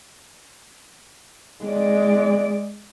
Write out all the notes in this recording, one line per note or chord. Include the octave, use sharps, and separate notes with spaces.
G#3 D5